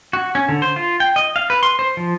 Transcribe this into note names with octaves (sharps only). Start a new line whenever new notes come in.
F#4
C#4
D3
C5
F4
G5
D#5
F5
B4
C6
C5
F3